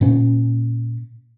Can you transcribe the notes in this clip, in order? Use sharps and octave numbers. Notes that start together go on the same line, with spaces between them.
A#2 C#4